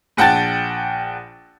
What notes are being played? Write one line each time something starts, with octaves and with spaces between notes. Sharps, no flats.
A#1 F#5 G5 A5 A6